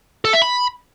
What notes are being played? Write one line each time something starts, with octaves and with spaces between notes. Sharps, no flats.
A4
E5
B5